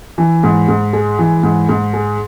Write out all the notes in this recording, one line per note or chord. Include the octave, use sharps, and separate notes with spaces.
E3
G#2
G#2
G#3
E3
G#2
G#2
G#3